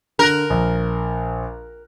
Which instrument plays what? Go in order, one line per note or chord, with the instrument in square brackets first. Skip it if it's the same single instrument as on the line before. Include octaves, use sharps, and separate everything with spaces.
[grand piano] D3 F#6 [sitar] A#4
[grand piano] A#1